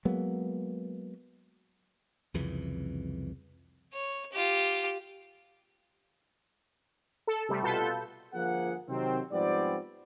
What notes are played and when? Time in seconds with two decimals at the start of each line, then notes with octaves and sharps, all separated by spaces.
0.05 F#3 G#3 A#3 B3
2.34 C2 F2 C#3 E3
3.93 C#5
4.32 F4 G4
7.27 A4
7.49 C3 G3 A3
7.63 B2 F4 A4 B4 G6
8.34 G1 F3 A#3 G#4 F#5
8.89 C3 D#3 F#3 C4
9.32 G#2 F3 G3 B3 C4 D5